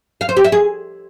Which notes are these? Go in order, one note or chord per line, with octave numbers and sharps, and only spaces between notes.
F5
C5
G4
E5
G#4